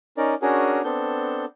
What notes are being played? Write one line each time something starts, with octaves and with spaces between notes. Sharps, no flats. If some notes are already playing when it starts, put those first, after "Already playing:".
C#4 D#4 A#4 D5
C#4 D4 F#4 G#4 A#4
B3 C4 D4 A4 G6